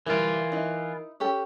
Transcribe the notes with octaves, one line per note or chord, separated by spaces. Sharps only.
E3 G3 E4 F4 A#4 D7
D#4 E4
C#4 G4 A4